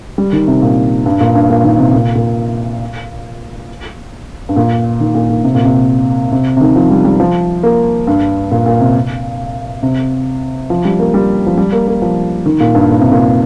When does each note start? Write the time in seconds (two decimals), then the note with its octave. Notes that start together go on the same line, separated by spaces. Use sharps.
0.18 G3
0.33 D#3
0.48 C3
0.62 A#2
1.06 G2
1.21 A#2
1.35 G2
1.50 A#2
1.64 D#3
1.79 C3
1.94 A#2
2.15 A#2
4.49 G2
4.56 A#2
5.00 D#3
5.15 A#2
5.30 A#2
5.44 C3
5.55 A#2
5.65 C3
6.32 C3
6.57 C3
6.61 D#3
6.76 F3
6.90 G3
7.05 G3
7.20 F3
7.63 A#3
8.07 G2
8.51 A#2
8.66 A#2
8.80 C3
9.82 C3
10.70 F3
10.85 G3
10.99 A#3
11.14 G3
11.46 F3
11.58 G3
11.72 A#3
11.87 A#3
12.02 F3
12.46 D#3
12.60 A#2
12.75 G2
12.90 A#2
13.01 C3
13.12 A#2